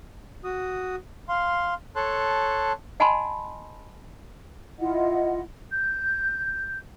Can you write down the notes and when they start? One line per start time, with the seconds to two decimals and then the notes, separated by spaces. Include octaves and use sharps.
0.44 F#4 D#6
1.29 F5 C6
1.96 A4 C#5 A5 C6 F#6
3.00 D#5 F#5 G#5 A5 B5 C6
4.79 E4 F4 D#5 F#5
5.71 G6